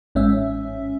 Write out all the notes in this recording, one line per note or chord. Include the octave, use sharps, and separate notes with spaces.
A1 G#2 C#4 E5